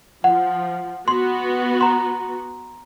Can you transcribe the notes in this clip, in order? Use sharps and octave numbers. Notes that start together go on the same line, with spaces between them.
F3 F#5
B3 F#4 C6
A#5 C6